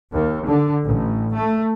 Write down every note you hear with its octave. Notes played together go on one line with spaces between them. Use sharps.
D#2
D3
A1
A3